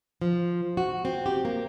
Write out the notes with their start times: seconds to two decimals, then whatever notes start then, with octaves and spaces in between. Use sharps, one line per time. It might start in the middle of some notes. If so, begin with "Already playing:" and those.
0.22 F3
0.77 F#4
1.05 C4
1.26 G4
1.45 A#3